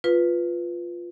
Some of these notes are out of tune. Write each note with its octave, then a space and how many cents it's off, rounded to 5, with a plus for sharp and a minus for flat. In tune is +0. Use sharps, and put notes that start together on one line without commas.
F4 +0 B4 +0